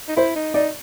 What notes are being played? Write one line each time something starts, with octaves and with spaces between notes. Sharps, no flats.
D#4
E4 C5
D#4
D#4 D5